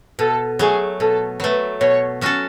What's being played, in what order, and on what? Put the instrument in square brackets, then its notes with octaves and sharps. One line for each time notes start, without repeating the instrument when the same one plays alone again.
[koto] B2 [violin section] A4
[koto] F#3 A3 [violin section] G#4
[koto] B2 [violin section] A4
[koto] F#3 A3 [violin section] B4
[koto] B2 [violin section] C#5
[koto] F#3 C#4 F#4 A4